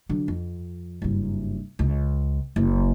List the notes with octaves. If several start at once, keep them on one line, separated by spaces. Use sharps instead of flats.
D3 F#3
F2
F#1 G2
C#2
F#1